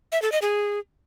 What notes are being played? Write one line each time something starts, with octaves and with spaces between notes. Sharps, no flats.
E5
A4
D#5
G#4